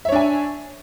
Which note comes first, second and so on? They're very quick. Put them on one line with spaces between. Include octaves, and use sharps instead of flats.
E5 C#5 D4 G#5